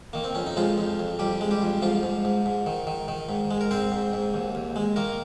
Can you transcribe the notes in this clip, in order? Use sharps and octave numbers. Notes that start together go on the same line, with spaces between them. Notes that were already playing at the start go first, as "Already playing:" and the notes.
D#3 A#3
C4
F2 C#4
D#4
F3 G#3 F4
F2
F2
F2 G3 G4
G#3
G3 G4
F2
G#2 F3 F4
G#2
G#2
G#2
D#3
D#3
D#3
G#2
G#3
A#4
G#2 C4 C5
G#2
G#2
D#2
D#2
G#3
D#3 A#3 A#4